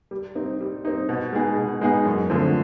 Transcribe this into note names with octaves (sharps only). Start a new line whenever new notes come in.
G3
C4 D#4
G3
C4 D#4
B2
G#3 B3 D#4 G#4
B2
G#3 B3 D#4 G#4
F#2
D3 F3 A3 C4